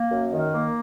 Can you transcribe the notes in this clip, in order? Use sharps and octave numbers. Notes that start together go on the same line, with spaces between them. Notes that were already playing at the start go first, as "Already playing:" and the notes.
Already playing: A#3
F#2
D#3
A#3